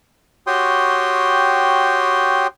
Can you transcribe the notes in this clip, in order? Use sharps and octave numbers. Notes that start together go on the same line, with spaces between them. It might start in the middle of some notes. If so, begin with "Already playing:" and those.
F#4 G4 C#5 G5 C6 D#6